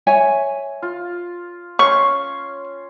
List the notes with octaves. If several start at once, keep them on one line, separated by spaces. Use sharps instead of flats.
C#5 E5 G#5
F4
C#4 C6 C#6